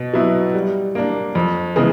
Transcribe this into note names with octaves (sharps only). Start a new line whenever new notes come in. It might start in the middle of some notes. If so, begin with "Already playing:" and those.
Already playing: B2
F#3 B3 E4
G3
A#3 D4
F2
C#3 E3 G#3 B3